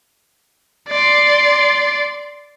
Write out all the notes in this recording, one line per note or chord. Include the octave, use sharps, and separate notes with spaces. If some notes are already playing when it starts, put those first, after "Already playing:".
D5 C6